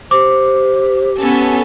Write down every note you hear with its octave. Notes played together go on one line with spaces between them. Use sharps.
G4 C5 D6
B3 C#4 A4